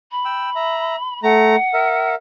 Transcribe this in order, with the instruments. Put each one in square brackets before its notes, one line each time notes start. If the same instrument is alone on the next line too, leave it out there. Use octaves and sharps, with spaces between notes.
[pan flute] B5
[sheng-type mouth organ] G5 E6
E5 A#5
[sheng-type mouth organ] A3 A#5 [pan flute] F#5
[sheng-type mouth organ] A#4 E5